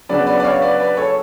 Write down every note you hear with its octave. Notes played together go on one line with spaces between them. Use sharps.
C#3 F#3 B3 D4 B4 D5
B4 D5
D5
C#5 F5
B4 D5
B4 D5
A4 C#5